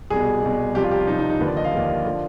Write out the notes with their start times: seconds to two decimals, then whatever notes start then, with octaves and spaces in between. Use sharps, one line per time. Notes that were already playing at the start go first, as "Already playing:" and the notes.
0.10 C2 G#4
0.16 B2
0.43 C2 B2
0.75 C2 C3 F3 G4
0.83 F4
0.91 G4
1.00 F4
1.07 C2 C3 F3 D#4
1.19 D#4
1.29 D#4
1.41 D#2 D3 F3 B4
1.48 D5
1.56 D#5
1.64 F5
1.72 D#2 D3 F3
2.04 D3 F3